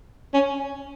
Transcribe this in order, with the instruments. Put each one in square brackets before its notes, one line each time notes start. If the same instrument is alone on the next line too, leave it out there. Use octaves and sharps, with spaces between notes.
[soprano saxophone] C#4